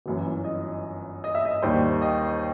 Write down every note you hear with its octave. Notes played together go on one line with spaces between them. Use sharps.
G1 F#2 E3
D#5
D#5
E5
D#5
D#2 D#3 G3 C5
D#5